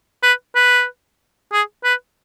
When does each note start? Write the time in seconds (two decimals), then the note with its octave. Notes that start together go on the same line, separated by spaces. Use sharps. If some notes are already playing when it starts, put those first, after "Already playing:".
0.23 B4
0.55 B4
1.52 G#4
1.84 B4